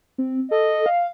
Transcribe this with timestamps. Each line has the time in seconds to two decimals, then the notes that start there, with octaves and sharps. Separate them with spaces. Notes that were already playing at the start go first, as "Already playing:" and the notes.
0.18 C4
0.51 A4 D#5
0.86 F5